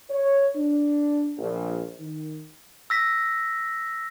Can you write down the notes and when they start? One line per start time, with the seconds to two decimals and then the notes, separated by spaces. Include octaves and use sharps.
0.10 C#5
0.56 D4
1.37 A#1
2.00 D#3
2.90 E6 A#6 B6